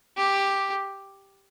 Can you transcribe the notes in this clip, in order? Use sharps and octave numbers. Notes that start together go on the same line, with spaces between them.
G4